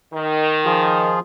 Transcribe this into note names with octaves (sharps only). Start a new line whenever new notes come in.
D#3
F3 F4 G#4